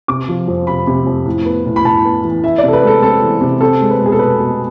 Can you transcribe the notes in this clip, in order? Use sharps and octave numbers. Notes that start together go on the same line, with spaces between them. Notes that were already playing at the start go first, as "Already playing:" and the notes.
C3 D6
F3
F2
C3 B5
C3
F2
A2
B3
A2
B5
A2 A5
B3
E3
E3 E5
C3 D5
A4
B4
G#3 A4
C4 A4
E3
C3
C4 A4
G#3
B4
B2
G#4
A4
B2 B4
B2